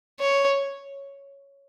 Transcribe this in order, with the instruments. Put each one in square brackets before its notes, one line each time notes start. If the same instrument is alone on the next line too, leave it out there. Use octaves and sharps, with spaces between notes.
[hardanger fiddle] C#5